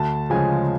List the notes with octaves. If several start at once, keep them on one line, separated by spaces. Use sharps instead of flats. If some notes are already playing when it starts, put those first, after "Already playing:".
Already playing: D2 A5
C#3 F3 G#3 G#5